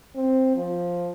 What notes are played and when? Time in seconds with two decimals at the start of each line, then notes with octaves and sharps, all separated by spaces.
0.15 C4
0.56 F3